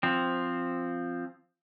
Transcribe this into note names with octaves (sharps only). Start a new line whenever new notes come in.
F3 C4